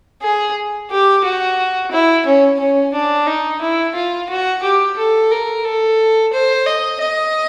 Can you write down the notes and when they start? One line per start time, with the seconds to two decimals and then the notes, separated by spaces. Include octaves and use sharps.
0.22 G#4
0.90 G4
1.24 F#4
1.92 E4
2.26 C#4
2.60 C#4
2.94 D4
3.27 D#4
3.61 E4
3.95 F4
4.30 F#4
4.63 G4
4.97 A4
5.31 A#4
5.65 A4
6.33 C5
6.66 D#5
7.01 D#5